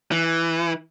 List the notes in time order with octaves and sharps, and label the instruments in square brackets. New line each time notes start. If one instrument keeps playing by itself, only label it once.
[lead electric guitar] E3